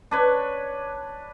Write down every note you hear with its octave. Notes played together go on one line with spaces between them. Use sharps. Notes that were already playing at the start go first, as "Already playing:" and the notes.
D4 B4 C#5